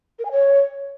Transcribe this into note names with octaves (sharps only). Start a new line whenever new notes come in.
A#4
G#5
C#5